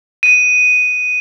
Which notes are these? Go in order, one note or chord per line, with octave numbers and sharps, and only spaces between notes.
D#7